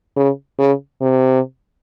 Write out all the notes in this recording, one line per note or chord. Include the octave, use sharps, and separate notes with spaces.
C#3
C#3
C3